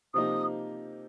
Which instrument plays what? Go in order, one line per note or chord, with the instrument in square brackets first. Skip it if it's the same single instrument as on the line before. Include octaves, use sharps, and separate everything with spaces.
[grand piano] C3 F3 A#3 D#4 G4 [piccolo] D#6